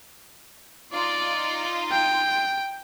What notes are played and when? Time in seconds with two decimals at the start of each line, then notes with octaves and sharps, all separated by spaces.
0.93 D#4 F4 D5
1.92 G5